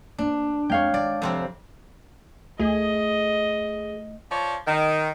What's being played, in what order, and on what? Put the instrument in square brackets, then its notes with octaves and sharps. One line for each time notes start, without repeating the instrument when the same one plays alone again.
[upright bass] A#3 B3 [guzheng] D4
[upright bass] F2 G#3 [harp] C#5 F5 G5
[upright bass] D#3 G#3 [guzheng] D5
[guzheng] F2 C3 C4
[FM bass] D2 [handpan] A3 [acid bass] G#4 [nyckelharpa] D#5
[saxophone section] F3 C#5 D5
D#3